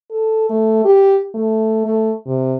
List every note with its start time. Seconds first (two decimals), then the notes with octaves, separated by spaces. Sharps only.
0.11 A4
0.50 A3
0.85 G4
1.35 A3
1.86 A3
2.26 C3